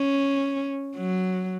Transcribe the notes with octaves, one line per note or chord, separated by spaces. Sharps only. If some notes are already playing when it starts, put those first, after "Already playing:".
Already playing: C#4
F#3